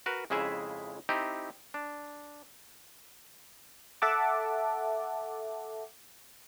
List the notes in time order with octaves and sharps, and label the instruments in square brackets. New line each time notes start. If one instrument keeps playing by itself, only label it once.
[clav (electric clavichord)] F#4 A#4 B4
F2 C#3 G#3 E4 G#4 E5
C4 D#4 E4 G4
D4
[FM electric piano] A4 E5 F#5 A5 D6